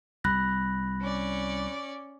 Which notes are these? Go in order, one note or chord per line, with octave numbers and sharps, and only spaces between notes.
C2 B5 F#6 A#6
C#4 D5